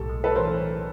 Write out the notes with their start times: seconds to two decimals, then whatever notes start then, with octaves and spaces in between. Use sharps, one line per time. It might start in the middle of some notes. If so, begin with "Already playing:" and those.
Already playing: B1 A2 G4 A4
0.09 G#3
0.24 B1 A4 B4
0.31 C#5
0.36 A#4 C5
0.39 E3